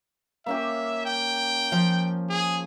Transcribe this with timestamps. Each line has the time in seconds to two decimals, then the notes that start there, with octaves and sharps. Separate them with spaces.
0.46 A#3 C#4 G4 E5
1.05 G5
1.72 F3 F5
2.30 G#4